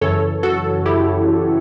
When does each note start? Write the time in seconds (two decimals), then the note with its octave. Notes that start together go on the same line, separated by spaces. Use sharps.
0.01 F#2 C#3 E3 A4 C#5
0.43 F#4 A4
0.86 E4 G4